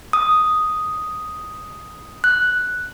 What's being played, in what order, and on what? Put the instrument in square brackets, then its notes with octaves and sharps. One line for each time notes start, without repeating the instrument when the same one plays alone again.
[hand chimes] D#6
F#6